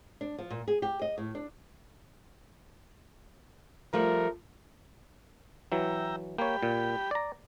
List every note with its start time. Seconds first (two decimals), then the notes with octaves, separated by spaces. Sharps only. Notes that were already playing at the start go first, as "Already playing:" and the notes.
0.21 D4
0.38 F3
0.50 A#2
0.68 G#4
0.82 G4
1.02 D#5
1.18 A2
1.35 D4
3.93 F3 G3 A3 A#4
5.72 E3 F#3 E5 G5 A#5
6.38 A#3 G4 C#5 G5 B5
6.63 A#2
7.11 D5 A#5